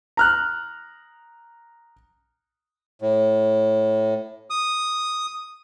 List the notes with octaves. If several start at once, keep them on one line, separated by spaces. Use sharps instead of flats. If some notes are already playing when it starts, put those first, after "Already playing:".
A#5 F6 F#6
A2
D#6